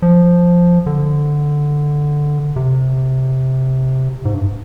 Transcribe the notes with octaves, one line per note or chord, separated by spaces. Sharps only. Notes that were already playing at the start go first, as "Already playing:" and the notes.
F3
D3
C3
G#2
G2